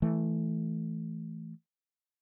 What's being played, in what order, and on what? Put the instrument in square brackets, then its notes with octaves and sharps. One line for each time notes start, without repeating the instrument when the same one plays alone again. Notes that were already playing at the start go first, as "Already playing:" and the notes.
[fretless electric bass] E3 A3